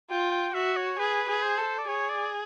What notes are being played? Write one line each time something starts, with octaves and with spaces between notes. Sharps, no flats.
F4 G5
G5
F#4 E5
C#5
G#4 B4
G#4
C5
A4
D5
G#4 C#5
D5